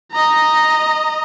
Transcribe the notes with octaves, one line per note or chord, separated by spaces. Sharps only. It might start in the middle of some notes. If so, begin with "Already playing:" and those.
D#5 A#5